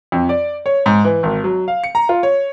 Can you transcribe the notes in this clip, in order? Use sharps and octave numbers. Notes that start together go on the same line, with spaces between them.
F2
D5
C#5
G#2
E3
G#1
F#3
F5
C#7
A#5
F4
C#5